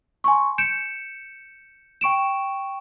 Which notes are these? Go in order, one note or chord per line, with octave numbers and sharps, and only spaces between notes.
G#5 C6 C#6
G6 C#7 D7 E7
G5 C#6 D7 E7